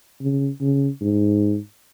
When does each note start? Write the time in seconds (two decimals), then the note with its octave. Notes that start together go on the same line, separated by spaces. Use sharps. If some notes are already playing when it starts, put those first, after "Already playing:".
0.21 C#3
0.61 C#3
1.01 G#2